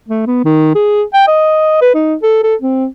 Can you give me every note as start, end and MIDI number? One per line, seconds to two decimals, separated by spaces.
0.09 0.23 57
0.27 0.42 59
0.45 0.75 51
0.75 1.03 68
1.14 1.27 79
1.28 1.80 75
1.82 1.90 71
1.94 2.15 63
2.23 2.40 69
2.44 2.55 69
2.62 2.86 60